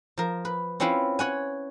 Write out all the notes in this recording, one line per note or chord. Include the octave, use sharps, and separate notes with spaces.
F3 A#4
B4
C4 C#4 E4 F4 B4
C#5 F#5 G#5